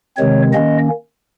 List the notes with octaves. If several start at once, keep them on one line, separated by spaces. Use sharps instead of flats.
C3 D#3 G#3 C4 C#5
D#3 A#3 C#4 D#5